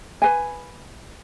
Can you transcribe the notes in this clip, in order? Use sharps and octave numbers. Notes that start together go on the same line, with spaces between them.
B4 G#5